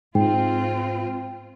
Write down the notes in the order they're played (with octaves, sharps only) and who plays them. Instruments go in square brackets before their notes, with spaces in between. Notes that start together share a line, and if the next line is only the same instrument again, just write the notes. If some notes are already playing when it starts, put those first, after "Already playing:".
[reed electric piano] G#2 [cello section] C4 F4 [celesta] G5